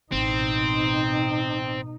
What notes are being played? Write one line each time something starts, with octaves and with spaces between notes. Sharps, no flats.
A1 B2 C4 D#4